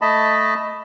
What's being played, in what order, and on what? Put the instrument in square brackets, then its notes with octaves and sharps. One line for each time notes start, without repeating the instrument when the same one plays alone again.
[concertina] A3 D#5 A5 B5